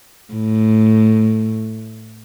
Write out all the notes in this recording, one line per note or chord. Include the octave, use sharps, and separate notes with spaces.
A2